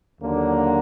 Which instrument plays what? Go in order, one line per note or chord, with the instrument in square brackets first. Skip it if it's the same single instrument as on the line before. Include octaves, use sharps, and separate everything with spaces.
[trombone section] D#2 D3 F#3 A#3 D4